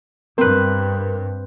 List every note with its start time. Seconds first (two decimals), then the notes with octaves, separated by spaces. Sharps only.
0.38 G2 C4 A#4 B4